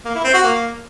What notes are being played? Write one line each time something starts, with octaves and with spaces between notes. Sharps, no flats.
A#3
E4
C4
F#4
A#3